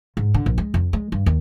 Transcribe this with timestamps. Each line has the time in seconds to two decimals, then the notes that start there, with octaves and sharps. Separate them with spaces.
0.17 G#2
0.34 D3
0.46 A#1
0.58 G#3
0.74 F2
0.93 G#3
1.12 G2
1.26 D#2